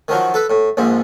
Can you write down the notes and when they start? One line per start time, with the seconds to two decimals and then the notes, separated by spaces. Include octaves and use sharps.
0.08 D#3 F3 F#3
0.34 A4 B4
0.50 A2
0.77 A#1 G#2 F3